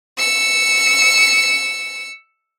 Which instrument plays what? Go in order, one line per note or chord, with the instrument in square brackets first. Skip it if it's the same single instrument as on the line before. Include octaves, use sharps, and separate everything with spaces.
[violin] E6 C#7